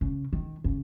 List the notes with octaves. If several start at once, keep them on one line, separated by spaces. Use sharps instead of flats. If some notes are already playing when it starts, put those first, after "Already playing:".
C#3
D#3
C#3